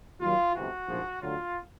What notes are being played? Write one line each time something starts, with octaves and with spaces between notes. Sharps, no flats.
D#2 D#3 F#3 F4
G1 F2 C3 E3 F#4
A#1 G#2 F3
D2 D3 F#3 F4